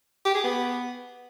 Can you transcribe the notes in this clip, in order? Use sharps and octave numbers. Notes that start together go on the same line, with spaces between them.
G4
G#4
B3